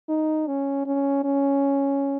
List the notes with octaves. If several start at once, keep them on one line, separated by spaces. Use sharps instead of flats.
D#4
C#4
C#4
C#4